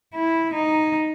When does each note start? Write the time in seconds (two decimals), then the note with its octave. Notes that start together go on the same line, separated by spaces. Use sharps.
0.14 E4
0.54 D#4